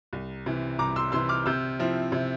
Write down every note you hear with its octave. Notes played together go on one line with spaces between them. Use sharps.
C2
C3 E3
C2 A#5 D6
C6 E6
C3 E3 C6 E6
D6 F6
C3 E6 G6
F3 C4 E4
C3